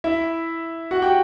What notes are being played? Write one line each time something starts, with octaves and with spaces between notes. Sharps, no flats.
E4 E5
F#4 F#5
G4 G5